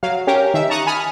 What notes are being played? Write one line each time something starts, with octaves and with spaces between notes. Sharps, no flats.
F#3 F5
C#4 G4 A#4
D#3 E5
A5 A#5 C#6 D#6 F#6
G#5 B5 D#6 F6